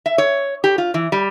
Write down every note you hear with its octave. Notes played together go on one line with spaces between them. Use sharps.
E5
C#5
G4
F4
E3
G3